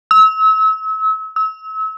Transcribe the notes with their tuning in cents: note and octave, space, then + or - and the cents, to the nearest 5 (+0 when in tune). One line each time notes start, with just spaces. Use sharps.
E6 -35
E6 -35